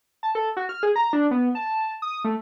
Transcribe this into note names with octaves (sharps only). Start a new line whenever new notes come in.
A5
A4
F#4
F6
G#4
A#5
D4
B3
A5
D#6
A3